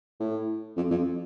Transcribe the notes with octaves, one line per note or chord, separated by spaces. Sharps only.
A2
F2
F2